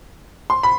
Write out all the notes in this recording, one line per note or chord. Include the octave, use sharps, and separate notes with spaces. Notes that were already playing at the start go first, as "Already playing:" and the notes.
C6
B5